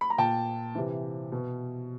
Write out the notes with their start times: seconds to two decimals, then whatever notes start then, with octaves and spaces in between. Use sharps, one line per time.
0.01 B5
0.10 A#5
0.18 A#2 G5 A5
0.75 C3 E3
1.32 B2